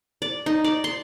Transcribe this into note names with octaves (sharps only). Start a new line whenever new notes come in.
D5
D#4
D5
C6